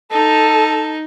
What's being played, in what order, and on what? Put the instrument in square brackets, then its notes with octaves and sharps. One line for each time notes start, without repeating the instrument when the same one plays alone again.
[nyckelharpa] D#4 [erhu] A4